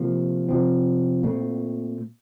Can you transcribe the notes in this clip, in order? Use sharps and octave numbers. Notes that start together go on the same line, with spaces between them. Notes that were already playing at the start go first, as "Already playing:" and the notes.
Already playing: C3 F3 A#3
C3 F3 C4
A#2 A3 C4